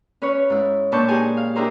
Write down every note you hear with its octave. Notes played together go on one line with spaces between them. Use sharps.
C#4 B4 C#5
G#2 E4
A#2 D4 B4 A5 C#6 G6
D#4 G4 G#4 G#5
F5
D4 E4 G4 G#4 A#4 C5